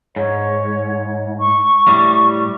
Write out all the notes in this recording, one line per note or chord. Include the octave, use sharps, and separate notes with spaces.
G#2 C#5
C#6
A2 G3